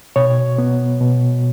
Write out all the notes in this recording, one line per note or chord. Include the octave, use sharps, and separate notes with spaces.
B2 C#5
B3
B2